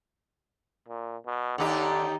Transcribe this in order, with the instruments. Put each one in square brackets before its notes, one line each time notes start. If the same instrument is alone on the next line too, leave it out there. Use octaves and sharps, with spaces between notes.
[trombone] A#2
B2
[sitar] D#2 D#4 G4 [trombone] D3